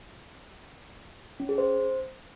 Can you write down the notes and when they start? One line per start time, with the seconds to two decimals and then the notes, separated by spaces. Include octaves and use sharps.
1.40 C#4
1.49 G#4
1.58 C5